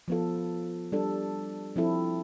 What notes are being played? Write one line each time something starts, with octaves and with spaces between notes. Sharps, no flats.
F3 B3 F4 A4
G3 D4 A4
F3 C4 E4 A4